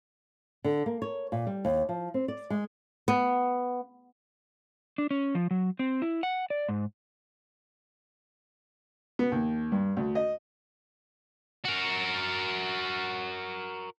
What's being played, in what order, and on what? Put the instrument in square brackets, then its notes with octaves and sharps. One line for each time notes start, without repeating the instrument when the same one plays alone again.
[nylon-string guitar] D3
A#3
C#5
A#2
G3
D#2
F3
C4
D5
G#3
B3
[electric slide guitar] D4
C#4
F3
F#3
C4
E4
F#5
D5
G#2
[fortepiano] B3
D#2
G2
D2
D#5
[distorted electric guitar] F#4 A#4